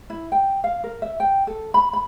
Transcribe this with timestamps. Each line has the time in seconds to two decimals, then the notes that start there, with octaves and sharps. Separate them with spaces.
0.10 E4
0.32 G5
0.64 F5
0.84 A#4
1.02 E5
1.20 G5
1.47 A4
1.74 B5
1.93 B5